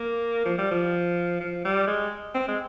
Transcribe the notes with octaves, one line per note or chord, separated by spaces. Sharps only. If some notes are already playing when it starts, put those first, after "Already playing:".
Already playing: A#3
F3
G3
F3
F3
G3
G#3
C4
G#3